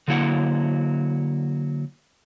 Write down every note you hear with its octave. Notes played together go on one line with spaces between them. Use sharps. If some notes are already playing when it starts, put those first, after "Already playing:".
D3 F#3 A#3 E4 F#5